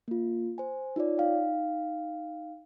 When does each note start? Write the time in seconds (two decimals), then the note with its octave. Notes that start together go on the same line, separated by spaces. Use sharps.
0.08 A#3 F4
0.58 C5 G#5
0.96 D#4 F4 C#5 D5
1.18 D#4 F5 G5